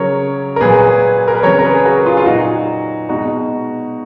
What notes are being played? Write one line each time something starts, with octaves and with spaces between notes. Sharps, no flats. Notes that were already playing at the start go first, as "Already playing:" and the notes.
Already playing: C#3 F#3 A#4 C#5
A#4
A#2 F#3 G#4 B4
A#4
B4
C#3 F#3 A#4 C#5
A#4
G#4 B4
G#4
F#4 A#4
F4 G#4
F4
A#2 F#3 D#4 F#4
B2 G#3 D#4 F#4